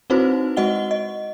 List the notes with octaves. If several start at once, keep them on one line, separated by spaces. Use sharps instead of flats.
C4 D#4 E4 F#4 B4 C5
G#3 F#4 D#5 F#5 G7
D#5